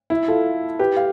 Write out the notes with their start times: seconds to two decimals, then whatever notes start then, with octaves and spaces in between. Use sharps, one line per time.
0.10 E4
0.28 F4 A4
0.79 G4 B4
0.97 F5